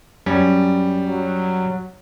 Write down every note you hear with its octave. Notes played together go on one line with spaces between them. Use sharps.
F#2 G3 C#4
F#3